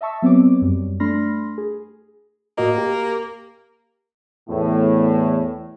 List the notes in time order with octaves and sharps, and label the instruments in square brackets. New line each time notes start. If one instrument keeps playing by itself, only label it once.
[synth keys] D#5 E5 A5 C#6 E6
F#3 B3 C4 C#5 D6
F#2 G3
A3 D4 B5 C6 F6 A#6
G#4
[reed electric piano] A2 F#4 D#5 [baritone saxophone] A#3
[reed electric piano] G4 A#4
[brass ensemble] E2 A2